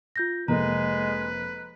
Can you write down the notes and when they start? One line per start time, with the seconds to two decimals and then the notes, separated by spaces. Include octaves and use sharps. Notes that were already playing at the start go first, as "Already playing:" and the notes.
0.16 F4 G6 A#6
0.48 F1 G#3 A#3 B4 A#5